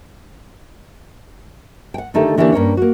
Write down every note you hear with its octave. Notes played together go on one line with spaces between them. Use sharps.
F#5 G5
D3 D#3 A3 D#4 G4 A4
D3 E3 A#3 C#4 D4 G4
G2 A#3 C#4 C#5
A#3 F#4